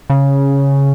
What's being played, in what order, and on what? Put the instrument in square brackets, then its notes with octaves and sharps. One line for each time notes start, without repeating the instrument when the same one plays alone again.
[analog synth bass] C#3